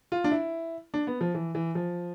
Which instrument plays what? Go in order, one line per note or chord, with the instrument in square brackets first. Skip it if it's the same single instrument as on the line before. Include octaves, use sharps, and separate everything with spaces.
[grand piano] F4
D4
E4
D4
B3
F3
E3
E3
F3